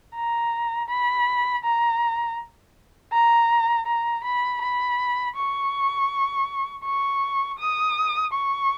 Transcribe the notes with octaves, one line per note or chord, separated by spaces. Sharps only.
A#5
B5
A#5
A#5
A#5
B5
B5
C#6
C#6
D#6
C#6